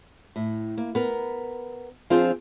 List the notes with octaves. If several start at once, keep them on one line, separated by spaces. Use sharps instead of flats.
A2
A#3
B3 A#4
F3 C4 D4 F4 G#4 C5